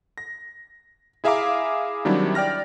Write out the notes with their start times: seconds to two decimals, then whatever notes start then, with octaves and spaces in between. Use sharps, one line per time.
0.18 A#6
1.24 E4 G#4 E5 F5 A#5 D6
2.05 D#3 F#3 G3 C4 D4 E4
2.35 D5 G5 F6 A#6